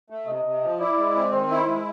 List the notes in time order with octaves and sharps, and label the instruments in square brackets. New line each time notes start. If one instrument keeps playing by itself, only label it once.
[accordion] A3
[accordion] C3 [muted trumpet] D#5
[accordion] C3
F3
[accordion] E4 [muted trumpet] D5
[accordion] G#3
C4
[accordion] D#3 [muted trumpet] C5
[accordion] E4
G#3